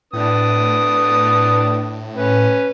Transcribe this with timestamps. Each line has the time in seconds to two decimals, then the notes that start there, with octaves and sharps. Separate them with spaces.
0.13 A2 D4 B4 D#6
2.17 C#4 B4